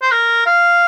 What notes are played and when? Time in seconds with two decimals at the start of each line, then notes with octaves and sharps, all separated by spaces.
0.02 C5
0.11 A#4
0.46 F5